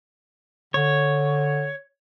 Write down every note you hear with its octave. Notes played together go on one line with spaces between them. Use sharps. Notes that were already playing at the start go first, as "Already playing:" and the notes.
D3 C#5